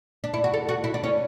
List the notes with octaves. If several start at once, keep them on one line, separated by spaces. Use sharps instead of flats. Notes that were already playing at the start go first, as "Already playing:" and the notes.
D4
E4
F#4
A4
F#4
E4
D4
C#4